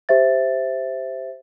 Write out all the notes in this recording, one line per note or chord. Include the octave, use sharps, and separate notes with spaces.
G4 C5 E5 A6